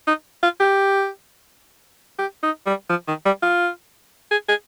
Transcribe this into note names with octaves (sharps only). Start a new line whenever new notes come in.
D#4
F4
G4
G4
D#4
G3
F3
D#3
G3
F4
G#4
G#4